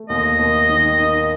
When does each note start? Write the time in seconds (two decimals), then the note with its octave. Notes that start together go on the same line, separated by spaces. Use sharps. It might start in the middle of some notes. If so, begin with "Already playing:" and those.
Already playing: A3
0.09 D#2 D#5
0.39 D#2
0.69 D#3
0.99 D#4